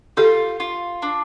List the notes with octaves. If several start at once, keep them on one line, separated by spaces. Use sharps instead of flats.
F4 G4 A4
F4
D4